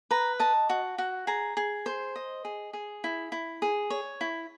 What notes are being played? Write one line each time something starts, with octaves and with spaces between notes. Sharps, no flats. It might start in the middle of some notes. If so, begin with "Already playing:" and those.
B4 A#5
D#5 A5
F#4
F#4
G#4 A#5
G#4
C5
D#5
G#4
G#4
E4
E4
G#4
C#5
E4